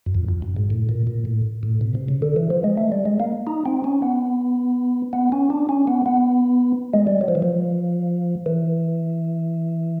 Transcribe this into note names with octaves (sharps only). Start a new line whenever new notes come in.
F#2
F2
F2
F#2
G#2
A2
A#2
A#2
A2
A2
B2
C3
C#3
D3
E3
F3
G#3
A3
G3
G#3
A#3
D#4
C4
C#4
B3
B3
C#4
D4
C#4
B3
B3
G#3
G3
F#3
F3
E3
F3
E3